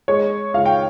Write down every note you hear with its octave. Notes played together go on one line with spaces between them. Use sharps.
G#3 C#5
C#2 F5
G5